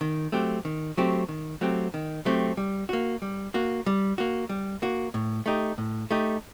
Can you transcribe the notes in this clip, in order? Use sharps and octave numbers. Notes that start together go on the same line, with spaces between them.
D#3
F#3 A3 C4 G4
D#3
F#3 A3 C4 G4
D#3
F#3 A3 C4 G4
D#3
F#3 A3 C4 G4
G3
A#3 F#4
G3
A#3 F#4
G3
A#3 F#4
G3
A#3 F#4
A2
A3 D#4 G4
A2
A3 D#4 G4